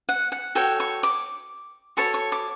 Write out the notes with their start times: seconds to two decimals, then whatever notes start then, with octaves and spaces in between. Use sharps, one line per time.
0.09 F#5
0.32 F#5
0.55 F#4 A4 C#5 G5
0.80 C#6
1.03 D6
1.97 F#4 A4 C#5 C#6
2.14 C#6
2.32 D6